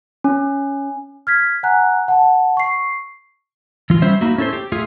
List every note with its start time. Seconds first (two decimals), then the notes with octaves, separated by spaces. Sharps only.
0.24 C#4
1.27 F6 G#6 B6
1.63 F#5 G#5 A#5 F#6
2.08 F#5 A5
2.57 C#6 C7
3.90 E3 F4
4.02 G3 C#4 C5 E5
4.21 A#3 D#4 E4 F#4
4.38 C#4 E4 A4 B4 C5
4.53 G4
4.72 A3 F4 G#4